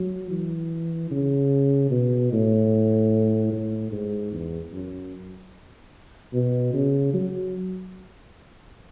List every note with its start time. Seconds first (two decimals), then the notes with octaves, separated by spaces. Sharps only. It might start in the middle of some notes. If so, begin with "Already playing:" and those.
Already playing: F#3
0.30 E3
1.11 C#3
1.91 B2
2.32 A2
3.52 A2
3.92 G#2
4.32 E2
4.73 F#2
6.33 B2
6.73 C#3
7.14 F#3